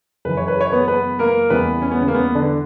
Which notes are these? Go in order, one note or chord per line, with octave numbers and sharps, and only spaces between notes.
F#2 C#3 E3 B4
C#5
B4
C#5
B3 B4
B3 B4
A#3 A#4
E2 C#3 E3 G3 B3 B4
C#4
B3
C#3 C#4
A#3
B3
D3 D4